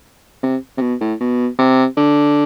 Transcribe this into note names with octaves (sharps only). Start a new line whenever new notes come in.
C3
C3
B2
A2
B2
C3
D3